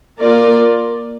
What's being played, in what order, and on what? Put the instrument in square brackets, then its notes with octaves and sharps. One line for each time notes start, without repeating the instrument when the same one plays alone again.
[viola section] A#3 F4 A#4 D5